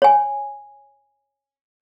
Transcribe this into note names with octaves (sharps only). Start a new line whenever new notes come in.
C#5 G#5